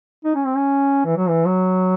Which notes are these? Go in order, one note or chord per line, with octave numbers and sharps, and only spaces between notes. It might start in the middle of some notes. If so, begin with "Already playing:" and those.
D#4
C#4
C4
C#4
E3
F#3
E3
F#3